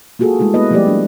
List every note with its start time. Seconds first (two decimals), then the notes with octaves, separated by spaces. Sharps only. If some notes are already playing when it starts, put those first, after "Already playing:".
0.19 A#3 F4 F#4 G#4 A4
0.39 G#3 A3 E4 A4
0.54 A#3 B3 E4 B4 D#5
0.71 F3 G3 A3 B3 G4 D5
0.87 G3 G#3 D4